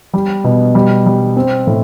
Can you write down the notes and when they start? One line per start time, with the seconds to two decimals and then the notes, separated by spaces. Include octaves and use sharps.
0.13 G3
0.44 B2
0.75 G3
1.06 G3
1.36 C4
1.67 A2